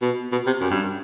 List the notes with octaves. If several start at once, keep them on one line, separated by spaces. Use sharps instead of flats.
B2
B2
C3
F#2
G2